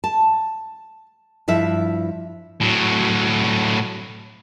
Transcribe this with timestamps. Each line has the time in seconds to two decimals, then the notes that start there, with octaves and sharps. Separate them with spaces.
0.04 A5
1.48 G2 F3 E4 E5
2.61 A2 F#3